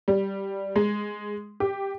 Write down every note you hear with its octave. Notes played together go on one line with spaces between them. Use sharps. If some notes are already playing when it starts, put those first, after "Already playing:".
G3
G#3
G4